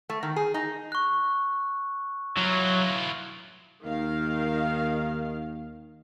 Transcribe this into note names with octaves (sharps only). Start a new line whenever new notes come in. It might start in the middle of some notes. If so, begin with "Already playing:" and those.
A3
D#3
G#4
D#4
C#6 F#6
E3 F#3 F4
D#2 D#3 F5